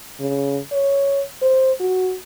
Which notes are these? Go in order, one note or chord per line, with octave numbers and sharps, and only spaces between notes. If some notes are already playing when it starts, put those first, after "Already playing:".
C#3
C#5
C5
F#4